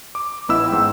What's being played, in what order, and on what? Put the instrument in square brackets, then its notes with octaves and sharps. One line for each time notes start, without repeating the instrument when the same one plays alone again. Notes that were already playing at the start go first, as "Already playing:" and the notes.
[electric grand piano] D6
A1 B3 E4 D#5 B5 E6
G#2 G5